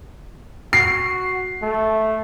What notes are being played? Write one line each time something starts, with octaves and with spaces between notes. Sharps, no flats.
F#4 C7
A3